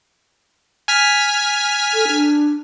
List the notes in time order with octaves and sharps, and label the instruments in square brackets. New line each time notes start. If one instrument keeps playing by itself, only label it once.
[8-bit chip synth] G#5 F6 B6
[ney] A4
D4